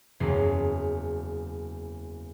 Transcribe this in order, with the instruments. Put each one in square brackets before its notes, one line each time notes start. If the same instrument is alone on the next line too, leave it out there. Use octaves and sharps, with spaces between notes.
[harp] F#1 E2 F#3 C7